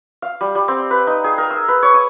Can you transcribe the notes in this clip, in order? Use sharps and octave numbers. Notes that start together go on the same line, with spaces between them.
F5
G3
G3
C4
B4
D#4
G#4
A#4
E6
B4
C#5
D#6